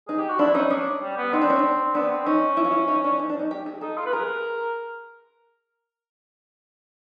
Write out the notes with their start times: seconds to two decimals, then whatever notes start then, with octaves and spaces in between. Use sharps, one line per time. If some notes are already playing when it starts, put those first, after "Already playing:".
0.08 D#4 G#4
0.19 G4
0.29 F#4
0.39 D4 E4
0.55 C#4 D#4
0.70 C#4 D4
1.02 G3
1.17 B3
1.33 C4 D#4
1.41 D4
1.50 C#4
1.59 D4
1.95 B3 D4
2.10 C4
2.26 C#4 D#4
2.57 E4
2.65 F4
2.72 E4
2.88 D#4
3.04 D4
3.20 D#4
3.29 D4
3.39 D#4
3.51 G4
3.66 G#4
3.81 D#4 A4
3.98 F4
4.06 B4
4.13 G#4 A#4